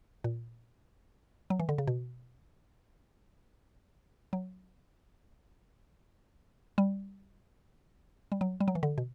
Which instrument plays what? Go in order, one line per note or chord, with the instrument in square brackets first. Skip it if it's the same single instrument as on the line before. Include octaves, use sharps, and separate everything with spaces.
[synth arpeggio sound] A#2
F#3
E3
D3
C#3
B2
F#3
G3
G3
F#3
G3
F#3
E3
D3
B2